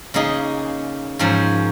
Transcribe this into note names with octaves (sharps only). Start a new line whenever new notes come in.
C#3 A#3 D#4 G#4
G#2 F3 C#4 A#4